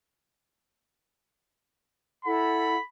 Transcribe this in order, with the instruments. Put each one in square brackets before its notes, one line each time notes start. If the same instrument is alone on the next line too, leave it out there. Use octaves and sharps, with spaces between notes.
[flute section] E4 A4 F#5 [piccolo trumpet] B5